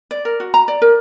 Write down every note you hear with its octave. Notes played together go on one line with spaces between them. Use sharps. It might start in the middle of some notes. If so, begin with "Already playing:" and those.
D5
A#4
F#4
A#5
D5
A#4